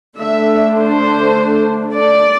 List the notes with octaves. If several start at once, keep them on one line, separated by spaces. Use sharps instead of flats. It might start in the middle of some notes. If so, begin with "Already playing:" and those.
D3 A3 D4 E5
C5
D5